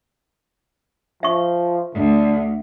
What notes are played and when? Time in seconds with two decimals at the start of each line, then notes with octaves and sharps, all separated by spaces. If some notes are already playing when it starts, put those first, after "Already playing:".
1.23 F3 E5 C#6
1.94 D2 D3